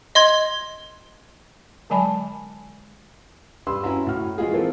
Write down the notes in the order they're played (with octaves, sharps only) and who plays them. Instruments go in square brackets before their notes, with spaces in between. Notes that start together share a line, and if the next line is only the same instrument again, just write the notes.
[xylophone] D#5 C6 G#6 G7
[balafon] D3 F#3 G#3 G#5 A5 B5
[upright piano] G2 G4 B4 C6 E6
C#4 E4 F#4 E5 A#5
A2 F#4 F6
E3 F3 G#3 F4 F#4 G#4
E3 A#3 C4 F4 A4